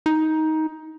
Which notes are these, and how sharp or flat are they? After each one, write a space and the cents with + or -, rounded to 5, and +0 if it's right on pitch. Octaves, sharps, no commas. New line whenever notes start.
D#4 +15